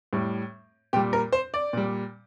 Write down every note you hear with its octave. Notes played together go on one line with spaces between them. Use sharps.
A2 G3
A#2 G3 G4
A#4
C5
D5
A#2 G3